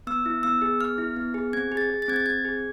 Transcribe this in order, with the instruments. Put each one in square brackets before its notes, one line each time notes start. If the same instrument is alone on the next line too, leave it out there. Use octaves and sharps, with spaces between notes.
[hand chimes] B3 E6
E4
B3 E6
G#4
B3 F6
E4
B3
G#4
C4 G#6
G#4
A6
G#4
A6
C4 G#6
A6
C4 G#6
G#4